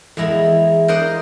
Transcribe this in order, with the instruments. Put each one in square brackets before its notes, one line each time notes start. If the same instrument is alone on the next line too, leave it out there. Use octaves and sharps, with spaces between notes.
[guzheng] E2 G#3 E4 A#5
A#4 C5 D5 D#5 F#5 C6